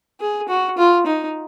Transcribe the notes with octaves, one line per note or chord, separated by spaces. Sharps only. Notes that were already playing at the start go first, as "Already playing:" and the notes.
G#4
F#4
F4
D#4